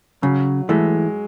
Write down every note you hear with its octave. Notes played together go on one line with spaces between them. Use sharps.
C#3 F#3
E3 G#3 A3